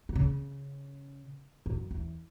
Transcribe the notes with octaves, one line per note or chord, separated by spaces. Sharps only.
E3
C#3
F#2
E2